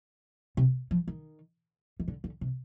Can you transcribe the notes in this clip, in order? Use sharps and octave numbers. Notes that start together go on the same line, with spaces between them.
C3
F3
D#3
D#3
D3
D3
C3